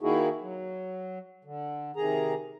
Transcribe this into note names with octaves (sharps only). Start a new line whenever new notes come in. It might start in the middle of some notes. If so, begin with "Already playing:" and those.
D#3 A#3 D#4 E4 F#4 G#4
F#3
D3
C3 D#3 G#4 A#5